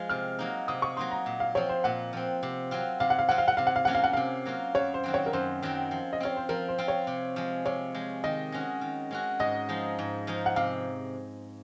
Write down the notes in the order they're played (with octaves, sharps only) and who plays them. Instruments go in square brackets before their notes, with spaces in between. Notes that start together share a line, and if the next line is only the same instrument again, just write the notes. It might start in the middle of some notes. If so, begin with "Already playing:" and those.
Already playing: [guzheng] F3 G#3 F4
[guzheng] C3 [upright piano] F6
[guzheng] F#3 A#3 D#4
[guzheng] C3 [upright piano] D#6
[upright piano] C#6
[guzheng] F#3 A#3 D#4 [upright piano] C6
[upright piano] A#5
[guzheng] A#2
[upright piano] F5
[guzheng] F3 C4 [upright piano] C#5
[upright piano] C5
[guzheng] A#2 [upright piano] F#5
[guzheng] F3 C4
C3
F#3 C4 F4
[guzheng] C3 [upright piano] F5
[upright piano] F#5
F5
[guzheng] F#3 C4 F4 [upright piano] F#5
[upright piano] F5
F#5
[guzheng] C3 [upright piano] F5
[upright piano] F#5
F5
[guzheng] F#3 A#3 C#4 F4 [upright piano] F#5
[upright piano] F5
F#5
[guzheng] C3 [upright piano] F5
[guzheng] F#3 A#3 C#4 F4
[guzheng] F#2 [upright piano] C#5
[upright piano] C5
[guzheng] D#3 F#3 C4
[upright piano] C#5
A#4
[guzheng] F#2 [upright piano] C5
[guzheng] D#3 F#3 C4
F3
[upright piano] D#5
[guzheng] C4 F4 [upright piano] C#5
[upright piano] C5
[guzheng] F3 [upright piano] A#4
[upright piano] C5
[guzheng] C4 F4
[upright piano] C#5
[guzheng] C3
F3 G#3
[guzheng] C3 [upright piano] C#5
[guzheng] F3 G#3
[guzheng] D#3 [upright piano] D#5
[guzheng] G#3 C#4 F#4
D#3
G#3 C#4 F#4
[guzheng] G#2 [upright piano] D#5
[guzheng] F3 G#3 D#4
G#2
F3 G#3 D#4
[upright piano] F#5
[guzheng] C3 [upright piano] F5